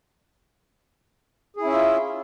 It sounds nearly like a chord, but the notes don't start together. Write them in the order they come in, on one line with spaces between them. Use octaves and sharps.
G#4 E4 C#4 E5 F4